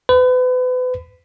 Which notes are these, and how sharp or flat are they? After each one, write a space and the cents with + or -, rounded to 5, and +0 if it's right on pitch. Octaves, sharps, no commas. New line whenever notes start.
B4 +35